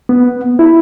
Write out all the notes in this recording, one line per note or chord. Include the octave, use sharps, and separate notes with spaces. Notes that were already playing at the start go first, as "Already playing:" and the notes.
B3
E4